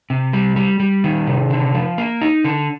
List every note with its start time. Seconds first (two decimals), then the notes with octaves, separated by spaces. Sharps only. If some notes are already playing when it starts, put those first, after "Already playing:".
0.10 C3
0.33 G3
0.56 G3
0.80 G3
1.04 D#3
1.27 C3
1.50 D3
1.74 F3
1.98 A#3
2.22 D#4
2.44 D3